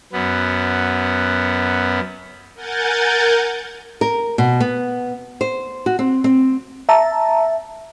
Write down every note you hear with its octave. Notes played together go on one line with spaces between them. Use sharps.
F#2 B3
A#4 F#5 G#5 G6 A6
A#4
B2
B3
C5
F#4
C4
C4
E5 A5 A#5